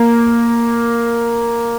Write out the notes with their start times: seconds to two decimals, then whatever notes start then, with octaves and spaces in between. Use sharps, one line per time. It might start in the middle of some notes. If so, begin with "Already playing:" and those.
Already playing: A#3